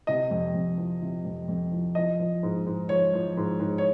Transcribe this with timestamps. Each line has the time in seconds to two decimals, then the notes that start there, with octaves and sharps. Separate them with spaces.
0.07 C3 D#5
0.31 F2
0.54 F2
0.78 F3
1.02 C3
1.25 F2
1.48 F2
1.72 F3
1.95 F3 D#5
2.20 F3
2.43 G#2
2.66 G#2
2.89 F3 C#5
3.13 F3
3.37 G#2
3.60 G#2
3.78 C#5